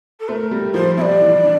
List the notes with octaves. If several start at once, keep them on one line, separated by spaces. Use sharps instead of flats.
A4
A3 A#4 C5
G3
F3 C5
G3 D5 E5
E3
D4